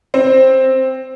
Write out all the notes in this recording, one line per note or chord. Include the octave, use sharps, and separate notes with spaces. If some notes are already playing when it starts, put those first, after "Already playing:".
C4